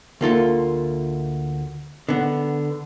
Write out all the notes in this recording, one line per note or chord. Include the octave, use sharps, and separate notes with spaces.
D2 A#3 F4 A4
D3 B3